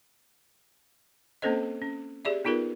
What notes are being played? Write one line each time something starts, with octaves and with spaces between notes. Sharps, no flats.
A#3 C4 C#4 A4 C5 D#5
C#4
G4 G#4 D5 E5
B3 D#4 F4 G#4 A#4 B4